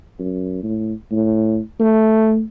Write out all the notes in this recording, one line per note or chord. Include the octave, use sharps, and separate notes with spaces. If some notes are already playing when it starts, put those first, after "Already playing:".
F#2
A2
A2
A3